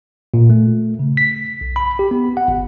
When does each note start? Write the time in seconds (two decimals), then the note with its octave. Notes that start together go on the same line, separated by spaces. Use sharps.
0.34 A#2
0.50 A3
0.99 C#3
1.17 B6
1.61 B1
1.76 B5
1.99 G4
2.11 B3
2.37 F#5
2.48 G1